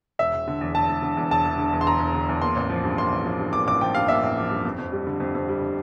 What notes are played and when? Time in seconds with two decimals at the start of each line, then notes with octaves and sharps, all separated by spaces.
0.19 E1 E5
0.33 E1
0.48 D3
0.61 E2
0.75 E1 A5
0.89 E1
1.02 D3
1.17 E2
1.31 E1 A5
1.45 E1
1.58 D3
1.73 E2
1.81 C6
1.86 E1 A#5
2.00 E1
2.14 D3
2.29 E2
2.42 A#3 C6
2.56 A1
2.70 F3
2.84 G2
2.98 A#3 C6
3.12 A1
3.25 F3
3.40 G2
3.53 A#3 D6
3.68 A1 D6
3.81 F3 G5
3.95 G2 F5
4.08 A#3 E5
4.23 A1
4.37 F3
4.51 G2
4.65 F2
4.78 F2
4.92 G3
5.07 D3
5.20 F2
5.35 F2
5.49 G3
5.61 D3